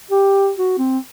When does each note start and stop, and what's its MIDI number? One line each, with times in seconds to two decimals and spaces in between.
0.11 0.51 67
0.58 0.77 66
0.79 0.98 60